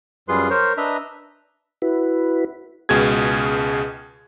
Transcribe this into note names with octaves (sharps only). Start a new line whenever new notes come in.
F#2 G3 F4 G#4 B4 C6
A#4 C5 C#5
D4 B4 D#5 E5 A#5
E4 F#4 B4
C#2 B2 G#4 G#6